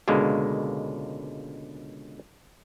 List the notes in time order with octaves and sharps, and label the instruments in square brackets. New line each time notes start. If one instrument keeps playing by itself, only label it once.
[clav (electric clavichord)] C#2 B2 D3 G#3 A#3